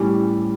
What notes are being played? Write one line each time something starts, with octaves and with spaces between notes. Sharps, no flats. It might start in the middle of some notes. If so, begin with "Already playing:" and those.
Already playing: A2 E3 G3 C#4 G4